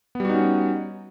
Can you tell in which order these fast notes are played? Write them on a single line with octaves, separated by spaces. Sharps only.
B3 G3 F#4 D#4 C#4